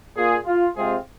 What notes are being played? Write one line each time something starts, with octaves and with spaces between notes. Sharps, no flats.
A#2 A#3 F4 G#4
F4
C3 G#3 C4 F4 G#4